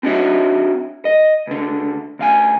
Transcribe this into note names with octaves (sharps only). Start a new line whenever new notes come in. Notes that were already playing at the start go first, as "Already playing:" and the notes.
C4 D4 D#4 F#4 C#5 E5
D#5
C#2 D3
D2 F5 G#5